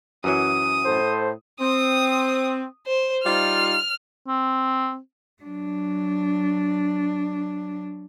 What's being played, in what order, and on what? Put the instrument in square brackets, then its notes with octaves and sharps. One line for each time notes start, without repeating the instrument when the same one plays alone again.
[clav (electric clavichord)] F#2 E3 F#3 [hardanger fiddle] D#6
[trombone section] A2 A4 C5
[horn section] C4 [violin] D#6
[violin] C5
[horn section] G3 D#4 F4 [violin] F6
[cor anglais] C4
[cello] F#3 D4